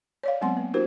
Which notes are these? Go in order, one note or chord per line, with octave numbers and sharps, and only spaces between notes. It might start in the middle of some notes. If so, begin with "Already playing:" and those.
C#5 D5 F5
F#3 G#3 B3 C4 F#5 C6
A#3
D4 E4 F#4 G4 A#4 C5